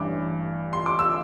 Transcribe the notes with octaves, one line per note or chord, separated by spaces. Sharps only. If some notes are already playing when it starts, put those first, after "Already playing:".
Already playing: A1 G2 E3 D6
C6
D6
E6